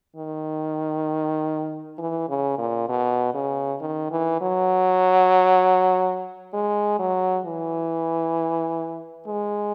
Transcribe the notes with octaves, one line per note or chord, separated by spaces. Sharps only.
D#3
E3
C#3
A#2
B2
C#3
D#3
E3
F#3
G#3
F#3
E3
G#3